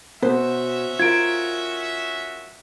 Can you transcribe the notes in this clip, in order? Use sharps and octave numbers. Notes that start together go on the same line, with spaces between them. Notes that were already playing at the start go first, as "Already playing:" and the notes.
B2 C#4 F#4 C5 E5
F4 A#4 G#6 D7